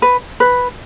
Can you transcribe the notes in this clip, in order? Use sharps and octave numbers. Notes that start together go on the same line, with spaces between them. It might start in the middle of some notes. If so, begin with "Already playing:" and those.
B4
B4